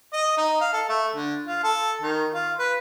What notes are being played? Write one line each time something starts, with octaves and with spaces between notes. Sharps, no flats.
D#5
D#4
F5
A4
A3
D3
F4
A4
D#3
F4
B4